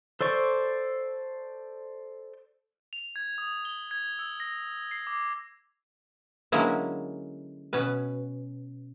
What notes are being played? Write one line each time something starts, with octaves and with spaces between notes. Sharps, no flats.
A4 C5 D5 C#6
F7
G#6
D#6
G7
G#6
E6
A#6
C7
D6
D3 F#3 G#3 A#3 C#4 E4
B2 C#4 B4